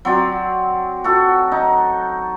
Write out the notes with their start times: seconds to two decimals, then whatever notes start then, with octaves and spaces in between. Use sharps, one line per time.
0.05 F#3 C4 D5
1.04 F#4 A4
1.52 D#4